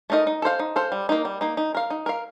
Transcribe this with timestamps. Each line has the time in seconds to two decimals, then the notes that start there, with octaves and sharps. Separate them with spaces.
0.10 A3 D#4 A#4 D#5
0.27 D#4
0.42 A4 C5 F5
0.59 D#4
0.76 A4 C5 F5
0.92 G3
1.09 A#3 D#4
1.25 G3
1.41 A#3 D#4
1.57 D#4
1.75 A#4 F5
1.90 D#4
2.06 A#4 F5